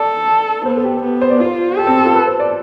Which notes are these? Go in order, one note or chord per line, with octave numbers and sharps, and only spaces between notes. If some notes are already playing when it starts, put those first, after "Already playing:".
Already playing: A4 D5
B3 C5
A4
G4
B3
C5
D5
F4 C5
G4 A4
C4
F4
B4
C5
D5